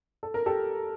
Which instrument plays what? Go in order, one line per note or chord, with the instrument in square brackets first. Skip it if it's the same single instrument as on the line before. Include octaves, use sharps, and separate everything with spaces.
[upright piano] A4
A#4
G4 A4